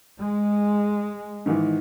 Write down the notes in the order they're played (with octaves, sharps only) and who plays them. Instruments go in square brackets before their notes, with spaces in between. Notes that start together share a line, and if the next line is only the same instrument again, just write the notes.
[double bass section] G#3
[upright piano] G#2 D#3 E3